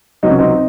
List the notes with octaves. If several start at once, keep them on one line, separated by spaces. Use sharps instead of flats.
C#2 C3 F#3 D#4
C#4
C4 D#4